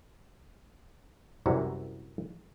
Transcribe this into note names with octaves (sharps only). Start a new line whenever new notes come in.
C2 F#2 C3 E3 F#4